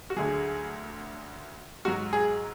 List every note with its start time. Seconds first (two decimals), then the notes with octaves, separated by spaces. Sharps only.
0.10 F#4
0.16 D2 D3 F#3 G#4
1.85 G#2 F#3 F#4
2.13 G#4